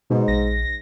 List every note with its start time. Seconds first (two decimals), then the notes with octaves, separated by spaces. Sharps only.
0.10 G#2 B2
0.28 A#1 A#6